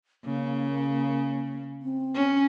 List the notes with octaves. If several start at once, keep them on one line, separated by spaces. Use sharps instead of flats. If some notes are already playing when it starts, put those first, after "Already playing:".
C#3 A#3
C4
C#4